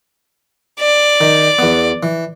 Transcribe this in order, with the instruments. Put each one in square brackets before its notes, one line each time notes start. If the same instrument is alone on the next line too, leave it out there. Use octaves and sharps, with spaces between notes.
[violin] D5
[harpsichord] D#3
E2 B3
E3